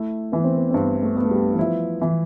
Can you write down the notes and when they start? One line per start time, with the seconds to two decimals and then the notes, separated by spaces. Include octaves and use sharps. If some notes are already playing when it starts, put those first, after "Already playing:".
Already playing: A3 E4
0.32 E3 B3
0.44 C4
0.56 B3
0.71 C4
0.74 G2 B3
1.03 A3
1.16 B3
1.24 A3
1.31 G3
1.54 E3
1.59 F3 E4
2.01 E3